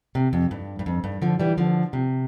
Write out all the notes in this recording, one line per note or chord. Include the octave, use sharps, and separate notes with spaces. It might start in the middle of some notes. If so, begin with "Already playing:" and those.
C3
F2
G2
G2
F2
G2
D3 F3
E3 G3
D3 F3
C3